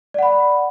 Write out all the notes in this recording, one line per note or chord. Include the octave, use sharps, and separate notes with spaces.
D5 F#5 B5